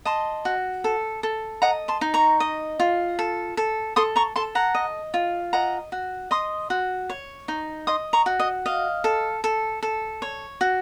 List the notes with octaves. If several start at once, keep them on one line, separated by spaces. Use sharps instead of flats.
D#5 A5 C6
F#4
A4
A4
D#5 F#5 A#5
A5 C6
D#4
A#5 C#6
D#5
F4
A4
A4
A4 C6 D#6
A#5 C#6
A4 A5 C6
F#5 A#5
D#5
F4
D#5 F#5 A#5
F#4
D#5 C6 D#6
F#4
C#5
D#4
D#5 C6 D#6
A#5 C#6
F#4
D#5
D#5 F5
A4
A4
A4
C#5
F#4